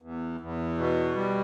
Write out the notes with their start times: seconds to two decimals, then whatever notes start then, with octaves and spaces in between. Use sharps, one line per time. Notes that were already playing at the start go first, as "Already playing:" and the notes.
0.02 E2
0.40 E2
0.78 B2
1.16 G3